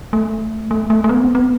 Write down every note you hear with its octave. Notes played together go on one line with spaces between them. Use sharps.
A3
A3
A3
A3
B3
C4
B3